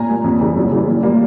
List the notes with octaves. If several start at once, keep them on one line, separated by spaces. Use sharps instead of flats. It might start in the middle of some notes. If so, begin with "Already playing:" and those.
Already playing: A#2 G#5 A#5
G3 A#3
F2
C#3 E3 G3
F#2
C#3 E3 G3
A#2
G3 A#3